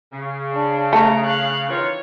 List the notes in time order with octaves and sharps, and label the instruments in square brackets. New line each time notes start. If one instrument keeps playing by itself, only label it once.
[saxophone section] C#3
[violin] D4
[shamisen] A3 [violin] A#5
[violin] F5 F#6
[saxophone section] D#3 E3 F4 [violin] C#5